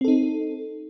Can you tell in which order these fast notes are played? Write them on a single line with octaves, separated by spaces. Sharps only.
C4 A4 D#4